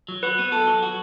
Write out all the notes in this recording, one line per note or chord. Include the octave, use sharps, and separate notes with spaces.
F#3
F#4 B4
B3
A4
F#3
F#4